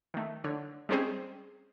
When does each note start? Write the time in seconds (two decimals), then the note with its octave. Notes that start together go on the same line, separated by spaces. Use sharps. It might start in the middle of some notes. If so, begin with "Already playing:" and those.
0.14 D#3 A3
0.44 D3 C#5
0.89 G3 G#3 C4 C#4 G#4 C5